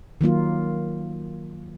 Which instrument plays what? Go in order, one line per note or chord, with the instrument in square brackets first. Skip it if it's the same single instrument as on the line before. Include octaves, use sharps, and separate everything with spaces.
[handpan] D#3 F#3 A#3 F4